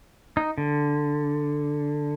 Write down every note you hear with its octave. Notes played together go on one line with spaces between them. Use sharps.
D#4
D3